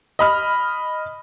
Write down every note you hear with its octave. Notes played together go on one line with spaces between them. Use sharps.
D#5 B5 F6